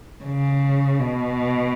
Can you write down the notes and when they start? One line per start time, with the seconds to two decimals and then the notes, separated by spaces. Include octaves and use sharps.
0.24 C#3
0.99 B2